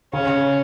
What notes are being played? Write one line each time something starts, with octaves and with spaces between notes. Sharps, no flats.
C#3 C#4